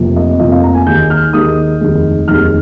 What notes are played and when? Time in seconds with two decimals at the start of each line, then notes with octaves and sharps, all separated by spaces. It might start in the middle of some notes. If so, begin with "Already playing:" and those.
Already playing: F1 F2 C3 F3 A#3
0.16 D#5
0.39 F1 F2 C3 F3 A#3 D#5
0.51 F5
0.63 A#5
0.75 G#5
0.86 D#2 D#3 G#3 G6
1.10 F6
1.33 D#2 D#3 G#3 D#6
1.81 F1 D#2 D#3 G#3
2.28 F1 D#2 D#3 G#3 F6